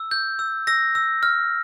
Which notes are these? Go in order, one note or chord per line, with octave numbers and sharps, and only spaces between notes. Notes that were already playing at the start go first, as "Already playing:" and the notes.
Already playing: E6
G6
E6
E6 A#6
E6
F6